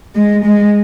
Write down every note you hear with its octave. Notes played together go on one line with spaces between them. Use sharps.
G#3
G#3